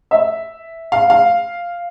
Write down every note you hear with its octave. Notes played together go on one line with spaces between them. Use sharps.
E5
F5
F5